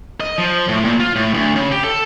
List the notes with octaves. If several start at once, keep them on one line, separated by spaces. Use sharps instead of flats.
D#5
F3
A2
A#2
F4
A2
D2
C#3
G4
A4